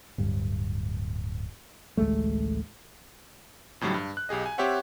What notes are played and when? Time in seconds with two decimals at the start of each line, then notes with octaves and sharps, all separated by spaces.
0.18 D1 G2
1.97 A1 D2 G#3 A3
3.81 F2 A2 D3 F#3 G3
3.94 G2
4.17 F#6
4.29 B1 G4 G#4 D#5
4.46 G#5
4.58 C4 G4 C5 C#5 E5 F#5